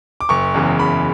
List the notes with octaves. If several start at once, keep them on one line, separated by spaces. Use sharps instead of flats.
D6
F#1 C#6
E2 C#3 E3 G#3
F#1 B5